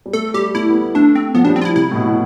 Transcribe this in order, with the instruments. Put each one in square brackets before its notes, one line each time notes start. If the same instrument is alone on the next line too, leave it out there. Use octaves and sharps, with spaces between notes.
[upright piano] G3
[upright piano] A3 [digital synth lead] A4
[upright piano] G3 [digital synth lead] G4
[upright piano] A3 [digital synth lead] E4
[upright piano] B3
A3
[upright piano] A3 [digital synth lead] D4
[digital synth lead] C4
[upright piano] F3 [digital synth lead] B3
[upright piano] G3 [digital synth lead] D4
[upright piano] F3
[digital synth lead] C4
F4
E4
[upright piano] C3 [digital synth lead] E4
[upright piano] A2
B2
B2